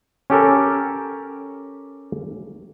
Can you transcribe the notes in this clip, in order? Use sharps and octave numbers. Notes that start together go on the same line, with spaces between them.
C#4 G4 A4 A#4